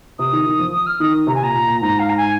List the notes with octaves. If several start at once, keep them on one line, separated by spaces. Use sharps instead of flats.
C3 D#6
D#3
D#3
F3
D#6
F6
D#3 D#6
C3 A#5
G#5
A#2 A#5
A#2
A#2
G#2 A#5
F5
A#5
G#5